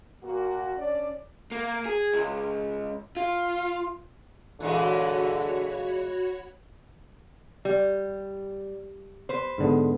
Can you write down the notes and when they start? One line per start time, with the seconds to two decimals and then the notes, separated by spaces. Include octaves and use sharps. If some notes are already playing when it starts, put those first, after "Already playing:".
0.23 A#2 A#3 F#4
0.77 C#4 D4 D5
1.52 A#3
1.86 G#4
2.13 C#2
3.17 F4
4.60 A#2 D3 E3 G#3 F#4 C#5 B5
7.65 G3
9.29 B4 C5
9.58 G#2 D3 B3